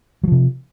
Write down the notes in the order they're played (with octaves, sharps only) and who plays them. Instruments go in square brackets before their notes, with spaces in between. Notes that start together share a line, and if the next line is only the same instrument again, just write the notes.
[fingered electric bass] F#3
F3
C3